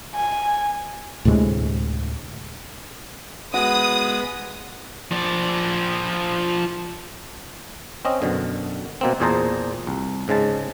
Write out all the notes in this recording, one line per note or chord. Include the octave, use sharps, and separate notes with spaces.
G#5
D2 A2 C3 G#3
G#3 B3 F#4 B4 D#6
F3 D5
C4 C#4 D#5
F#2 B2 D3
B2 A#3 C4
E2 A#2 G#4 C5 A5 A#5
C2
G#2 C#3 G#3 A5